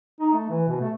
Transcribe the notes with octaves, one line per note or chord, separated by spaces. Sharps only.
D#4
A3
E3
B2
A3